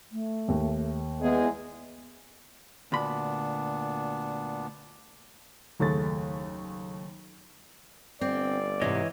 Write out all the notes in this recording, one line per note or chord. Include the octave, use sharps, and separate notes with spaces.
A3
D#2
E2 G#3 B3 G#4
D2 A#2 B3 D4 B5
F#1 D#2 A3 G#4 A6
G1 C4 D5
G#2 C3 E3 C#5 D#5